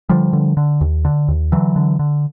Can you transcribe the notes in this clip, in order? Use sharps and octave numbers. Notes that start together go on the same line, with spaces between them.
D3 F3 G3
D3
D3
D#2
D3
D#2
D3 E3 F#3
D3
D3